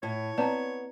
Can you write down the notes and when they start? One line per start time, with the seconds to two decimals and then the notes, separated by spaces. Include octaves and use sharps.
0.03 A2 C#5
0.38 B3 C4 D5 A5 A#5